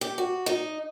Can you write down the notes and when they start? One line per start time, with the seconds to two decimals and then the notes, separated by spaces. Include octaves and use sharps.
0.01 G4
0.18 F#4
0.46 D#4